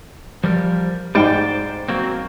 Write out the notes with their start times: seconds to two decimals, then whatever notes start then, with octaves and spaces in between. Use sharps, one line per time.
0.44 F3 G3 A#4
1.15 G#2 C5 D5 G5
1.88 F#3 A#3 C4